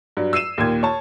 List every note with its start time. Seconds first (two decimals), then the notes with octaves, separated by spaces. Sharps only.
0.17 G2 F#3
0.33 E6 C7 D#7 E7
0.58 D#2 A#2 G#6
0.83 C#5 A5